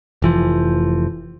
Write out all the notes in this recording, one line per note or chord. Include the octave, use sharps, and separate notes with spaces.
F1 E3 F3